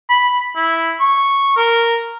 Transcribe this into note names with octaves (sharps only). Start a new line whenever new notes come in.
B5
E4
C#6
A#4